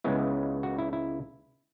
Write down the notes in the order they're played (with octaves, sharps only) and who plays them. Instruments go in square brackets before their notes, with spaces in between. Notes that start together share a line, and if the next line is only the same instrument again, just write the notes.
[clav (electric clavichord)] C#2 C#3 G#3 B3 E4
F#4
E4
E4